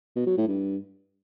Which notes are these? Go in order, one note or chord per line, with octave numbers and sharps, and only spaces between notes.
B2
F#3
A2
G2